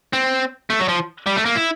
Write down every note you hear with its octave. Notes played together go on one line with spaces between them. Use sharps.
C4
A3
F#3
F3
G3
A3
A#3
E4